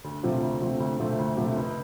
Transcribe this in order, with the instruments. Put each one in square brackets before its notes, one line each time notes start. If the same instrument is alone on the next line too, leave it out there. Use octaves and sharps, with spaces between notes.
[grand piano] D2
C3 F3 A3 C4
D2
C3 F3 A3 C4
D2
C3 F3 A3 C4
D2
C3 F3 A3 C4
C#2